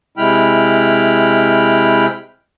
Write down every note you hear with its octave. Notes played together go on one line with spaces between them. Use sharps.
C3 G#3 E4 G5 B5 F6